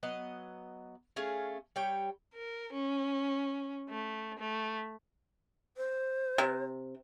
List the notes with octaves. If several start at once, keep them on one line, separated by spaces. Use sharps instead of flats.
F#3 B3 D#5
A3 C#4 G#4 F5
G3 C#5 G5
A#4
C#4
A3
A3
C5
C3